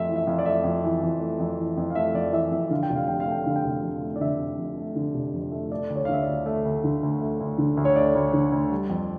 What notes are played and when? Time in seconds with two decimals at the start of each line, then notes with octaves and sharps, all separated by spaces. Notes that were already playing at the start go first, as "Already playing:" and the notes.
Already playing: F2 A3 E5
0.09 E3
0.16 E5
0.27 F2 F5
0.39 D5
0.46 A3 E5
0.64 F2
0.84 E3
1.03 F2
1.20 A3
1.40 F2
1.59 E3
1.77 F2
1.90 F5
1.95 A3 E5
2.14 F2 D5
2.33 E3 E5
2.52 F2 E5
2.70 D3 F5
2.83 G5
2.90 F1
2.96 F5
3.08 F2 G5
3.20 F5
3.27 A3 G5
3.44 D3 F5
3.56 G5
3.64 F1 F5
3.83 F2
4.02 A3
4.16 D5
4.20 D3 E5
4.39 F1
4.58 F2
4.77 A3
4.96 D3
5.14 F1
5.34 F2
5.52 A3
5.72 A3 D5
5.90 D2
5.96 C#5
6.05 F5
6.08 D3 E5
6.22 D5
6.27 D2
6.46 A3
6.65 D2
6.84 D3
7.03 D2
7.22 A3
7.40 D2
7.58 D3
7.77 D2
7.85 C#5
7.96 A3 D5
8.15 D2
8.33 D3
8.52 D2
8.71 G3
8.90 F2